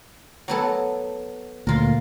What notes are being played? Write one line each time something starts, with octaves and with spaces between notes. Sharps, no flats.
F#3 B3 A4
D2 A#2 F4 A#4